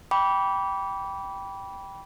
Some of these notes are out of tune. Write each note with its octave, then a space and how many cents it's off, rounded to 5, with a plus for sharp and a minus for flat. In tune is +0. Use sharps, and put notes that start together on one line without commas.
G5 +0 B5 -15 D6 -30